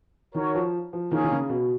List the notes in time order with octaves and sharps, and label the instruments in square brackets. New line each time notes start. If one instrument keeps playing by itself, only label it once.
[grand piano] D#3 [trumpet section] F#4 A#4 C#5
[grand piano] F3
F3
[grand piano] D#3 [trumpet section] A#3 C#4 G#4
[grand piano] D#3
C#3
B2